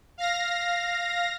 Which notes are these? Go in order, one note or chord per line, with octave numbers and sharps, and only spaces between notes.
F5 A#6